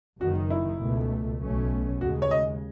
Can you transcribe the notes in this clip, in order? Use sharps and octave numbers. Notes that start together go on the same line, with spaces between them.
F#1 F#2 D#3 F#4
E4
C#2 B2 A3
B1 B2 A3 C#4
D#2 C#3 G#3 F#4
C#5
D#5